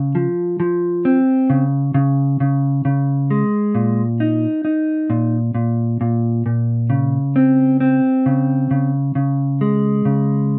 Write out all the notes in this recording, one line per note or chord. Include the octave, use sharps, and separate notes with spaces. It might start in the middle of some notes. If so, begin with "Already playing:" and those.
Already playing: C#3
F3
F3
C4
C#3
C#3
C#3
C#3
G#3
A#2
D#4
D#4
A#2
A#2
A#2
A#2
C#3
C4
C4
C#3
C#3
C#3
G#3
C#3